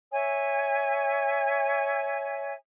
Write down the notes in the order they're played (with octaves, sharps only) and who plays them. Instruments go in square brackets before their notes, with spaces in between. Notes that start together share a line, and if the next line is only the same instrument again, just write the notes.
[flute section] C#5 E5 G#5